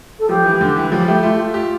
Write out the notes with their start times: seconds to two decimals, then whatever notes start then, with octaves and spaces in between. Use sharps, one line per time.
0.19 A4
0.29 F3 G4
0.45 E3
0.61 D3
0.76 E3
0.92 F3 G4
1.00 G3
1.07 A3 G4
1.23 A3 F4
1.32 G4
1.38 F4
1.54 G4